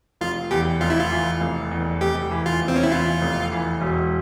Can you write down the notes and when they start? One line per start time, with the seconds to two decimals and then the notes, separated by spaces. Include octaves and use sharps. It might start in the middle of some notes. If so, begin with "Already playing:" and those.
0.21 F1 F4
0.51 E2 G4
0.81 F1 F4
0.90 E4
0.99 F4
1.11 E3
1.41 F1
1.71 E2
2.01 F1 G4
2.31 E3
2.46 F4
2.61 F1
2.68 C4
2.76 C#4
2.83 E4
2.91 E2 F4
3.22 F1
3.52 E3
3.81 E1